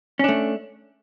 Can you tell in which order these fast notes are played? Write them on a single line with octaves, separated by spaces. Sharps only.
C#4 D4 A3